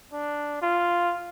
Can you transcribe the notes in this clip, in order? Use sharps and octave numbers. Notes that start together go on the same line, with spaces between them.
D4
F4